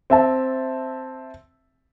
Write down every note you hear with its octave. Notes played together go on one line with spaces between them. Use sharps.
C4 E5 A5